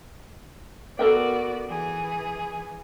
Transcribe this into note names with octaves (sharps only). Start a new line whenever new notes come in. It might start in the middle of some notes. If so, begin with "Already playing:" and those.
B3 F#4 A4 A#4 D5 G5
E3 G#4